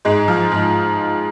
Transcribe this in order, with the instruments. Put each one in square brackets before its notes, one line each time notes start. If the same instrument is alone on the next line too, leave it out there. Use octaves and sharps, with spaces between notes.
[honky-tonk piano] G#2 G#3
F3
G#2